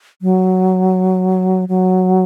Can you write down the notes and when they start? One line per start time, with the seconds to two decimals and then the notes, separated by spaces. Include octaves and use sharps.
0.22 F#3
1.69 F#3